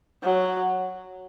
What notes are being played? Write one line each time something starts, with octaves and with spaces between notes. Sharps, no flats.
F#3